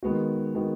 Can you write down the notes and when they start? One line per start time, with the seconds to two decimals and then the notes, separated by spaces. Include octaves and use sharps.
0.03 D#3 G#3 B3 F#4
0.55 D#3 G#3 B3 F#4